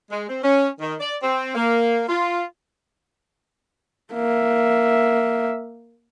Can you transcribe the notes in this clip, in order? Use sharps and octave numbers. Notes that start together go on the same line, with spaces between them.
G#3
C4
C#4
D#3
D5
C4
A#3
F4
A#3 E5